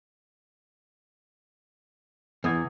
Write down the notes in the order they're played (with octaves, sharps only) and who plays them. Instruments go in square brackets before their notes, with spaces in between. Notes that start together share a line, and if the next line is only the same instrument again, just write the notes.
[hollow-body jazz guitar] E2 [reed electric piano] B3 D#6 G#6